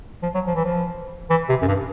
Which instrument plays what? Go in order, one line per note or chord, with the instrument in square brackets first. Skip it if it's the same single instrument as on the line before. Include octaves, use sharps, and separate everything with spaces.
[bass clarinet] F3
F#3
F3
E3
F3
E3
C3
F#2
G2